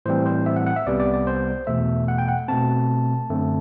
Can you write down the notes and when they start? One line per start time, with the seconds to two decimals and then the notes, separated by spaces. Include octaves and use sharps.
0.06 A2 E3 G3 C4 C5
0.26 C5
0.46 E5
0.56 F#5
0.66 F#5
0.76 E5
0.86 C2 C3 G3 B3 D5
1.00 D5
1.14 D5
1.27 C5
1.67 E2 B2 A3 E5
2.08 F#5
2.18 G5
2.28 F#5
2.48 B2 A3 C4 A5
3.30 F#2 D3 A3 C4